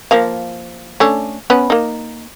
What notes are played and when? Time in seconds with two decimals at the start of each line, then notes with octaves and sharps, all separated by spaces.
0.11 F3 A#3 F5
1.00 A3 C#4 D4
1.50 B3 C#4 B4
1.70 A#3 D#4